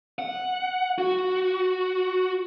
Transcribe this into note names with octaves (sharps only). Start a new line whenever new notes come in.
F#5
F#4